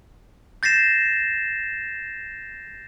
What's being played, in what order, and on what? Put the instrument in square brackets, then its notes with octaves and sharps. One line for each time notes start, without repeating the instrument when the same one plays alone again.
[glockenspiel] G6 A6 A#6 C7 E7